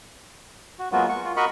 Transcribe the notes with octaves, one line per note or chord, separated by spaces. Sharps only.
F#4
F#3 G#3 A#3 B3 F4 F#4
C#6
F4
F#4 A#4 D#5 B5 C#6